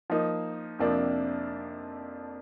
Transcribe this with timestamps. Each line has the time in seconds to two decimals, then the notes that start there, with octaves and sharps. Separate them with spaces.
0.10 F3 A#3 D#4
0.79 F2 C3 F3 A#3 D4